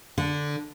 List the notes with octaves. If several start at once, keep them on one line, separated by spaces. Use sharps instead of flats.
D3